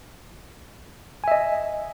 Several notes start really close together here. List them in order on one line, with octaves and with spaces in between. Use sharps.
G#5 E5 D#5